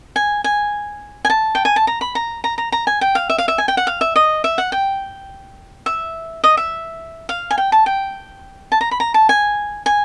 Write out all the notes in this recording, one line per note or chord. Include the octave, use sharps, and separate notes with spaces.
G#5
G#5
G#5
A5
G5
G#5
A5
A#5
B5
A#5
A#5
A#5
A#5
G#5
G5
F5
E5
F5
E5
G#5
G5
F#5
F5
E5
D#5
E5
F#5
G5
E5
D#5
E5
F5
G#5
G5
A5
G5
A5
A#5
B5
A#5
A5
G#5
G#5